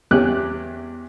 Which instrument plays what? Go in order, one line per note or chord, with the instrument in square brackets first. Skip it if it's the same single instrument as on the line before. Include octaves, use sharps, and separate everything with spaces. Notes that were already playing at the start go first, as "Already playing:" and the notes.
[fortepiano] E2 C#4 G4 F#6